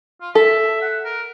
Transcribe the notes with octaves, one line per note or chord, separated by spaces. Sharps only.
F4
A4 E5
F#5
A#4